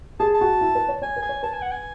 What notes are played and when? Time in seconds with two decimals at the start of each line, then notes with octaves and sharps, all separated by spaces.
0.20 G#4 A5
0.35 A5
0.41 F#4
0.61 E4
0.75 B4
0.89 C#5
1.02 C#5 G#5
1.16 B4
1.23 G#5
1.29 C#5
1.43 B4 A5
1.53 G#5
1.62 F#5
1.71 G#5